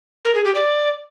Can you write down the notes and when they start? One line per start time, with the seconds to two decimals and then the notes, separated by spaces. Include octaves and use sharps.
0.25 A#4
0.35 G#4
0.45 G4
0.55 D5